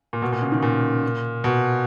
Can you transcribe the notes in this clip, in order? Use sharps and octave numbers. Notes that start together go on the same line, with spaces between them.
A#2
B2
A#2
C#3
D#3
A#2
B2